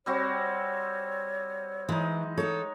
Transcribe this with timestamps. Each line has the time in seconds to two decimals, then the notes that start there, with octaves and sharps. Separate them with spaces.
0.06 G3 C4 F#4 C#5
1.89 E3 G#3 D#4
2.37 D#4 A4 C#5